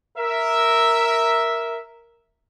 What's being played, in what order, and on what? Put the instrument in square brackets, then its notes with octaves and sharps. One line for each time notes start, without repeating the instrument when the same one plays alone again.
[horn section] A#4 E5